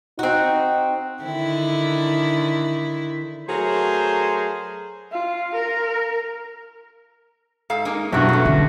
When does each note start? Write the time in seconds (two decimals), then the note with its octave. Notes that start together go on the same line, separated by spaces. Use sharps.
0.19 C4 D#4 F#4
1.23 D3 D#3 E4
3.48 F#3 A3 G#4 A#4 C5
5.12 F4
5.55 A#4
7.70 G#2 A4 F5
7.85 G#3 A#3 D#4
8.12 B1 G2 G#3 E4 F#4
8.29 C#3 A3
8.45 D3